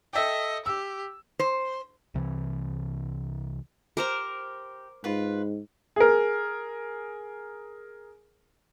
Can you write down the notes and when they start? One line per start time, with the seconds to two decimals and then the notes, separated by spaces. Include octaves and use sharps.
0.13 A4 D#5 E5 G5
0.66 G4 E6
1.39 C5
2.14 C2 C3 D#3 E3
3.97 G4 A#4 C5 A#5
5.04 G#2 F4 B4
5.96 G#4 A#4